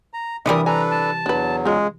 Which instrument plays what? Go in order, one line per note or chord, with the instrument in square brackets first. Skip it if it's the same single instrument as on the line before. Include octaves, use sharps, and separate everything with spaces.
[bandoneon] A#5
[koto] C3 E3 G3 [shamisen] D4 A#4 [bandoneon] E5 D#6
[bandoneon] D4 A4 B4 [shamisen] G#5 [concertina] A#5
[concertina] A5
[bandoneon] E2 F#3 [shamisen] D4 B4
[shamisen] C#3 F4 [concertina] G#3